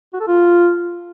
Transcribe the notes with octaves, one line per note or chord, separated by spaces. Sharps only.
F#4
A4
F4